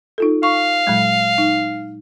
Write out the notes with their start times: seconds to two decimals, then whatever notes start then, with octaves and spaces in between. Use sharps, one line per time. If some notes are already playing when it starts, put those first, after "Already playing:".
0.18 D#4 F4 A4
0.43 F5 C#6
0.87 A#2 F#3 G#3
1.38 D#4